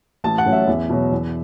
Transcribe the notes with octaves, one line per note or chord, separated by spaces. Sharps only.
A1 A5
F#5
A2 F#3 C#4
E5
E2
B2 F#3
E2